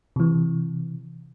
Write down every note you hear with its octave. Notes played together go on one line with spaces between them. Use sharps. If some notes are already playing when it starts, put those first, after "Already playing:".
C3 E3